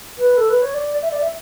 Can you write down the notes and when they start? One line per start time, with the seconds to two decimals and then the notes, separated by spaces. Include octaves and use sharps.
0.18 B4
0.37 A4
0.49 B4
0.62 C#5
0.74 D5
1.02 E5
1.11 D5
1.21 E5